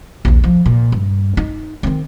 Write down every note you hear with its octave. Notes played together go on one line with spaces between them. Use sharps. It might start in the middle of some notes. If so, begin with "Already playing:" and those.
A#1 D#2
F3
A#2
G2
D#4
D#3 C4